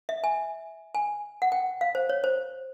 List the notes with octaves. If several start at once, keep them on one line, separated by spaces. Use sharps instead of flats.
E5
G#5
G#5
F#5
G5
F5
C5
C#5
C5